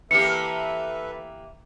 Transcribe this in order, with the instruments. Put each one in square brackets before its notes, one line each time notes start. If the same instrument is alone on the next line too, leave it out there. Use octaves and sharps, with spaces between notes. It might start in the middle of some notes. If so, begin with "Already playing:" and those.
[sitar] E3 A#3 G4 [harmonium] A4 B4 E5 [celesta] C#7